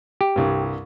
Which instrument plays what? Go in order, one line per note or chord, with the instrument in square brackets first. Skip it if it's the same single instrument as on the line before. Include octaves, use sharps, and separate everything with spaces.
[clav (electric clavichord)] G4
[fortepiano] C2 G2